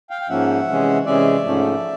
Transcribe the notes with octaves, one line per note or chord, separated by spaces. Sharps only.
F5 G5
G5
G#2 F3 A#3 C#4 E5 F#5
C3 E3 G#3 C#4
C3 E3 G#3 C#4 D5 E5
G#2 F3 A3 C#4